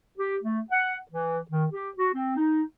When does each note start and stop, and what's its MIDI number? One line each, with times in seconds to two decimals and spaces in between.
0.18 0.37 67
0.43 0.60 57
0.71 0.96 78
1.11 1.40 52
1.51 1.65 51
1.72 1.90 67
1.98 2.10 66
2.14 2.33 60
2.37 2.62 63